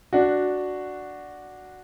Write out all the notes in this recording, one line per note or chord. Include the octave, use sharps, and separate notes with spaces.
D4 F#4